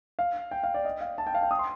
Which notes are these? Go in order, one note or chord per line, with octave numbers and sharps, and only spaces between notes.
F5
G5
F5
D5
D#5
F5
A5
G5
F5
G5
D#6
C6